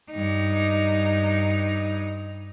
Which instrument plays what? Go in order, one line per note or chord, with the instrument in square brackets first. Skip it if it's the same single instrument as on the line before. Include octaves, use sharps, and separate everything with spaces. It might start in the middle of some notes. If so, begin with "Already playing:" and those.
[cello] G2 D#4